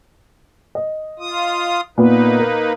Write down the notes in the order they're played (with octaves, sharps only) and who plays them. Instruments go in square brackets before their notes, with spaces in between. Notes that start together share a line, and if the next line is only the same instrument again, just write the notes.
[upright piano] D#5
[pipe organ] F4 D#6
[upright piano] A#2 B3 [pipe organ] A#3 D#4 B4
[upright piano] A#4